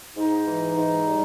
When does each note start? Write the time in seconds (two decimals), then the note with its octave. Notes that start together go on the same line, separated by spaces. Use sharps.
0.16 G#2 D#4
0.46 E3
0.76 G#2
1.06 G3